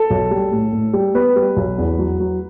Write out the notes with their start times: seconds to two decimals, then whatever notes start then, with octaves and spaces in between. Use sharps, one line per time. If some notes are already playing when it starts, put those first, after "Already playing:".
Already playing: A4
0.10 B1
0.31 G3
0.51 A2
0.73 A2
0.93 G3
1.14 B3 B4
1.36 G3
1.56 B1
1.78 E2
1.99 F#3
2.20 F#3